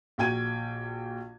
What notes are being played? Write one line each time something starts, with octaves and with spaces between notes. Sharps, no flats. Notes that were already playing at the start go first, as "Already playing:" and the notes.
A#1 F#4 G5 G#6 D#7